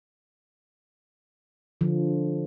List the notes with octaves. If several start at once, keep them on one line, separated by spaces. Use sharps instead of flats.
D3 F3